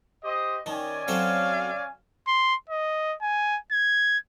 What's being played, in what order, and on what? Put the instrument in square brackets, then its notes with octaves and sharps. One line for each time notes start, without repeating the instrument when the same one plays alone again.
[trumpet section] G4 C5 D#5
[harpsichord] D#3 [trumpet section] C#4 D5 G#5
[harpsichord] F#3 C4 A4 [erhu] F5
[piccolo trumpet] C6
D#5
G#5
G#6